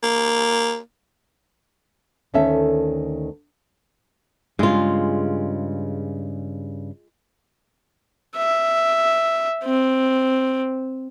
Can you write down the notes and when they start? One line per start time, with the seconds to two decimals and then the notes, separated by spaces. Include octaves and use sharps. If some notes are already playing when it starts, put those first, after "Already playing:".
0.03 A#3
2.34 D2 D#3 C#4 A4 E5
4.59 G2 C#3 G#3 F4
8.36 E5
9.65 C4